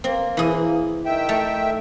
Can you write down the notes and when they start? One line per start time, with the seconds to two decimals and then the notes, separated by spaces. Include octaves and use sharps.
0.04 A#3 C4
0.37 E3 G#4
1.06 D#3 E5 G5
1.29 A3